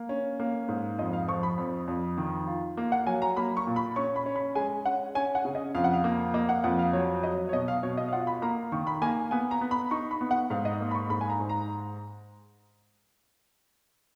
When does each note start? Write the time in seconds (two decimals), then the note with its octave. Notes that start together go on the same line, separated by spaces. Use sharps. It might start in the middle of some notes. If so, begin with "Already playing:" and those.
Already playing: A#3
0.09 C#4
0.40 A#3
0.68 G#2
0.99 F2 D#5
1.13 F5
1.28 F3 C#6
1.43 B5
1.58 F2
1.88 F2
2.18 D#3
2.47 F4
2.77 A#3
2.92 F#5
3.06 F#3 G#5
3.22 A#5
3.37 A#3 B5
3.57 C#6
3.67 A#2
3.76 B5
3.96 C#4 C#6
4.16 B5
4.26 C#4
4.36 B5
4.55 G#3 G#5
4.85 C#4 F#5
5.15 C#4 G#5
5.35 F#5
5.45 C#3
5.55 D#5
5.75 F2 F5
5.84 F#5
5.94 F5
6.04 A#3
6.34 A#3 D#5
6.49 F#5
6.64 F2 F#5
6.79 F5
6.93 F#3 C#5
7.23 F#3 D#5
7.49 C#5
7.53 B2 D#5
7.68 F5
7.83 B2 C#5
7.97 D#5
8.08 F5
8.13 F4 F#5
8.27 B5
8.42 A#3 A#5
8.72 D#3 C#6
8.87 B5
9.02 A#3 G#5
9.31 B3 G#5
9.51 A#5
9.61 B3
9.71 B5
9.91 D#4 C#6
10.11 B5
10.21 B3
10.31 F#5
10.50 G#2 F5
10.65 D#5
10.81 A#3
10.91 B5
10.95 C#6
11.10 G#2 B5
11.21 G#5
11.30 A#5
11.40 G#2
11.49 A#5